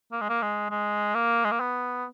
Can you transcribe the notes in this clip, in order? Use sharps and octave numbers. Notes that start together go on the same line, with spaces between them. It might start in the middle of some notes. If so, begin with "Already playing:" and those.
A#3
G#3
A#3
G#3
G#3
A#3
G#3
A#3
B3